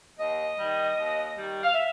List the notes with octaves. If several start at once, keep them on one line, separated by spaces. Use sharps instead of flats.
D#2 D#5
D#3 G3
D#2
D#3 G3
F5
E5